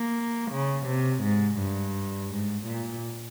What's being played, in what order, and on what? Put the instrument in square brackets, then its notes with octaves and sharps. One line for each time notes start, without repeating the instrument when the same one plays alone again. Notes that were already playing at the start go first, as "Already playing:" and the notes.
Already playing: [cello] A#3
C#3
C3
G#2
G2
G#2
A#2